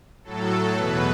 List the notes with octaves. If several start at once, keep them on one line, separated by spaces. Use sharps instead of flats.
A2 F#3 A4
E2 B2 F#3 B4